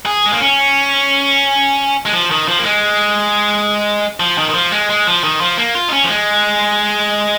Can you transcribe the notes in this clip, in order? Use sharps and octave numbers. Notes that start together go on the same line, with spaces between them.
G#4
G#3
A#3
C#4
G#3
F3
D#3
F3
A#3
G#3
F3
D#3
D#3
F3
G#3
G#3
F3
D#3
F3
A#3
F4
D#4
C#4
F3
G#3